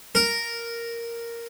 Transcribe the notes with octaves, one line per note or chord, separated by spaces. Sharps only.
A#4